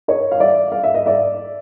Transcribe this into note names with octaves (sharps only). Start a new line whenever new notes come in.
C#5 D#5
F5
D5 E5
F5
E5
D#5
D5 E5